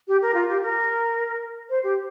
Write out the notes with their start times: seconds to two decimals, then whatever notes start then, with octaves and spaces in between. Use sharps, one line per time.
0.08 G4
0.22 A#4
0.34 F4
0.48 G4
0.62 A#4
1.70 C5
1.84 G4